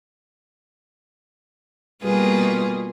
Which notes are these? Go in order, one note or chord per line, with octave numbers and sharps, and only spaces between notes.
B2 G3 A#3 F4 G#4 B4